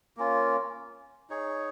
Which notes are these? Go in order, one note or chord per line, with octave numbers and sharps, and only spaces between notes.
A#3 C#4 F4
D#4 G#4 C#5